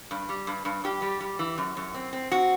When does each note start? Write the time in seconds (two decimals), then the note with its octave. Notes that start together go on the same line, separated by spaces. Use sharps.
0.11 G2
0.29 G3
0.47 G2
0.65 G2
0.84 G2 G4
1.02 G3
1.21 G3
1.39 E3
1.58 F#2
1.77 F#2
1.94 C4
2.13 C4
2.31 C4 F#4